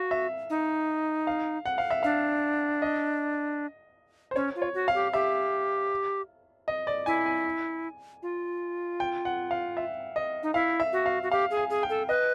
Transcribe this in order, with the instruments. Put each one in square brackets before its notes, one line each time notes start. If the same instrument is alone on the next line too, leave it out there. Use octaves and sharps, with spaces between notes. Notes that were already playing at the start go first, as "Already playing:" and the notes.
Already playing: [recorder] F#4 [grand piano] F5
[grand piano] E5
[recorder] D#4
[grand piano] F5
F#5
F5
E5
[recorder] D4 [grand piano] F5
[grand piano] D#5
C5
[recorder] C#4 [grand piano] C#5
[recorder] F4
[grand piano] C#5
[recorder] F#4
[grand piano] F5
[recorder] G4
[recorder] G4 [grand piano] E5
[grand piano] D#5
D5
[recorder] E4 [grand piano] G#5
[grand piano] G#5
[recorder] F4
[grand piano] G5
F#5
F5
E5
D#5
[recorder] D#4
[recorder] E4 [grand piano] F5
[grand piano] E5
[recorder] F#4
[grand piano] F5
[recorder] F#4
[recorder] G4 [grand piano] F5
[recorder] G#4
[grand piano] G#5
[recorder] G#4
[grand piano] G5
[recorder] A4
[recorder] B4 [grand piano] D#5